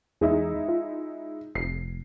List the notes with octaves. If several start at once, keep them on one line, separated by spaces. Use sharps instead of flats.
E2 G#3 D#4 E4
F4
F1 C7